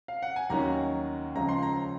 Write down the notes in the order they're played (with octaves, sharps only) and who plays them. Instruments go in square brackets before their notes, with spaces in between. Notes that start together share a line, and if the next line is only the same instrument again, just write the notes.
[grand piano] F5
F#5
G#5
[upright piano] D#2 D#3 F#3 C#4 F#4 [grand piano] A#5
[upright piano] C#2 C#3 F3 [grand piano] A#5
[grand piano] C6
A#5